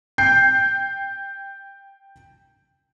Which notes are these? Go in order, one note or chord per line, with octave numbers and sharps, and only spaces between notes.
G5 G6 C7